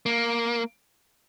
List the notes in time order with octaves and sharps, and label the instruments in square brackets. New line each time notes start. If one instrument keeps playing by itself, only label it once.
[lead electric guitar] A#3